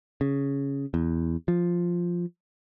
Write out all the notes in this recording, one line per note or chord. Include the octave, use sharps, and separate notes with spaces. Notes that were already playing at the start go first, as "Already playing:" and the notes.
C#3
E2
F3